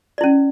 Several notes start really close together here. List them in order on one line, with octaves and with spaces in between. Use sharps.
D5 E4 C#4